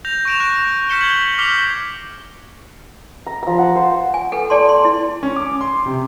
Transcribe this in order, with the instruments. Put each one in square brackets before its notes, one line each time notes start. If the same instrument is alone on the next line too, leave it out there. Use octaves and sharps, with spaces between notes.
[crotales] G6 A#6 F7
C#6 A#6 D7 E7 F7
C#6 F#6 A#6 D7
F6 G6 B6 C#7 E7 G7
G6 G#6 F#7
D6 F6 B6 C7 F7 G7
[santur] A#5
F3 A#5
F#5 A5
C5
[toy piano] G#5
A4 B4 F#5 G5
G#4 A4 D5 A5 C6
C6
E4 G#4
[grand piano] C#4
D6
C6
C3